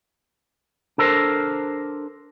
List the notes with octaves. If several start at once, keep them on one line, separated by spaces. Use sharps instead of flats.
D4 A4 A#4 C5